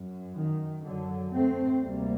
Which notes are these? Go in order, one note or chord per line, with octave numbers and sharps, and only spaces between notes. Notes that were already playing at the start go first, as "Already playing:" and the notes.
Already playing: F#2
D#3
F#2 D3 F#3
A3 C4
D2 C3 G3 A#3